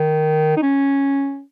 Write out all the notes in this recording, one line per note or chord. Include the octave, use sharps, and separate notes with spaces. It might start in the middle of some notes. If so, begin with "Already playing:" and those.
Already playing: D#3
D#4
C#4